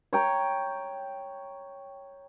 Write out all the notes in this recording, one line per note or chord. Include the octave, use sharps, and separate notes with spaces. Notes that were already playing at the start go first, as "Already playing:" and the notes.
C#5 G5 A#5